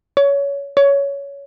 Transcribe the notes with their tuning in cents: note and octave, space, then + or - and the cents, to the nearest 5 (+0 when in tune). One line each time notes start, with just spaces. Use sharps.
C#5 +20
C#5 +15